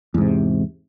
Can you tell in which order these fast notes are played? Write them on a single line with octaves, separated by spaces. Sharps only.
E2 G#2 C3